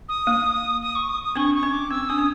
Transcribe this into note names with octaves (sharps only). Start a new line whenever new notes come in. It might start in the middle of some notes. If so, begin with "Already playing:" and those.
D#6
A#3
D#6
C#6
D#6
D#6
C4 D4 C#6
C#6
C#4
D6
C4 E6
D4 D#6
C#4